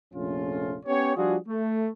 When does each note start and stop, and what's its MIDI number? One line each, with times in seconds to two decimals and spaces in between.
0.14 0.77 34
0.14 0.77 41
0.14 0.77 48
0.14 0.77 57
0.14 0.77 61
0.14 0.77 65
0.86 1.13 59
0.86 1.13 61
0.86 1.13 67
0.86 1.13 73
1.16 1.35 53
1.16 1.35 55
1.16 1.35 62
1.16 1.35 65
1.16 1.35 66
1.16 1.35 68
1.48 1.89 57